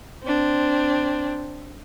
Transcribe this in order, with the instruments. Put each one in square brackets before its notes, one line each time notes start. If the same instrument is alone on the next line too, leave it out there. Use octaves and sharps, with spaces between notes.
[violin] C4 D4